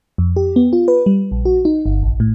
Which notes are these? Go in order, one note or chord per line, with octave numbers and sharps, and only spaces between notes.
F2
G4
B3
F4
B4
G3
A#1
F#4
D#4
G1
A#1
A2